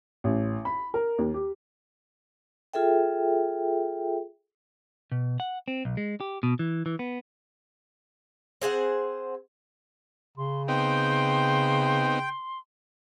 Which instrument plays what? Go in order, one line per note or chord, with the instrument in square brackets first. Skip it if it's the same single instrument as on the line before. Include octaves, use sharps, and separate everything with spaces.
[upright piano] A1
B5
A#4
D#2
G4
[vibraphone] F4 G#4 A4 E5 G5
[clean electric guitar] B2
F#5
C4
B1
G#3
G4
B2
E3
E3
B3
[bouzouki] C4 G#4 C5 F#5
[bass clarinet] C#3 [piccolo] C6
[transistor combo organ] B3 C4 D#4 [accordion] G5 [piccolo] C6